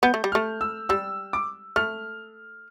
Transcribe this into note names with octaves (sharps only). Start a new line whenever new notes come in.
B3 G6
A3
G3
A3 F6
E6
G3 E6
D6
A3 F6